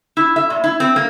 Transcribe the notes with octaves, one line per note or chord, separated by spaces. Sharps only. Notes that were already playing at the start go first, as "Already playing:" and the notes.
E4
E5
A#2
E4
C4
A#3